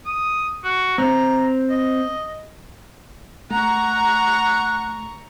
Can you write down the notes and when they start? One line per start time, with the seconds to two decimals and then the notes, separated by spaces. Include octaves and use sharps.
0.06 D#6
0.64 F#4
0.98 C4 A#5
1.70 D#5
3.51 A3 F#5 A#5 C#6